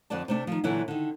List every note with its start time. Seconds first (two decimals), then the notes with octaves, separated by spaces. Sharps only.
0.10 F2 D3 D4 D5 A5
0.28 C3 A3 D4
0.47 D#3 F3
0.64 A#2 D3 E3 F#3 E4
0.88 D3 D#3